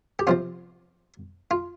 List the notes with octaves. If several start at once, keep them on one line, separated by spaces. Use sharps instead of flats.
G4
C3 F3 C4 F4
F4